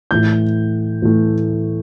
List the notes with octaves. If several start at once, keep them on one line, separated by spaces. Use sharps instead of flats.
A2 E3 A3 G6
A2 E3 A3